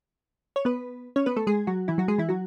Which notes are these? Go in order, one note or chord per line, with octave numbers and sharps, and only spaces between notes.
C#5
B3 B4
C#4 C#5
B3 B4
A3 A4
G#3 G#4
F#3 F#4
E3 E4
F#3 F#4
G#3 G#4
E3 E4
F#3 F#4